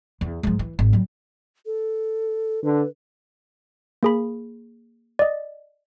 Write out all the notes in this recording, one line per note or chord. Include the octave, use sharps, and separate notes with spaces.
E2
G#2 F3
E3
G#1
F#3 G3
A4
D3 B4
A#3 G#4 B5
D5 D#5